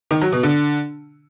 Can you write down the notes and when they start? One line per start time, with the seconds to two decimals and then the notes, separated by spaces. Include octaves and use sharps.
0.11 D#3
0.22 F#3
0.32 B2
0.43 D3